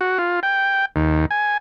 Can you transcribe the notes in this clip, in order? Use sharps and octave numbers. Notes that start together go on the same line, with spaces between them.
F#4
F4
G5
D#2
G#5